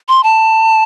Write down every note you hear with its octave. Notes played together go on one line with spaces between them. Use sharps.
C6
A5